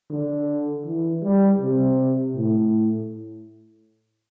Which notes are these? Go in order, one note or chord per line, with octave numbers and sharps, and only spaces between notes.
D3
E3
G3
C3
A2